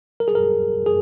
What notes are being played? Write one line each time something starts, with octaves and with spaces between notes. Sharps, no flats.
A#4
G#4
A#4
G#4